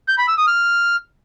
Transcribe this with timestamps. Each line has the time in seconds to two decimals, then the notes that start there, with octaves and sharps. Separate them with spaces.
0.08 G6
0.18 B5
0.28 E6
0.38 D#6
0.48 F6